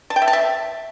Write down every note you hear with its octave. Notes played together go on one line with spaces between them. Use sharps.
A5
G5
E5
A5
E5